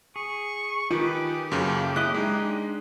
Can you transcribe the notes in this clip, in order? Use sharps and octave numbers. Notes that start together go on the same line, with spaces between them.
G#4 C#6
D#3 F4 G4 G#4 B4
F#2 C#3 A#3 A4
C#4 E4 D#5 F#6
G#3 D4 D#4 D#5